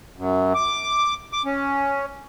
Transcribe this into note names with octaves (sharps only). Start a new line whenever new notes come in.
F#2
D6
D6
C#4